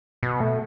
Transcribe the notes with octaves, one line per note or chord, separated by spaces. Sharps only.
B2
A3